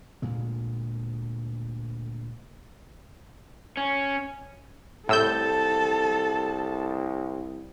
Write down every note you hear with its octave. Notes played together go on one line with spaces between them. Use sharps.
D2 A#2 G#3
C#4
C2 A2 A4 A5 E6 G6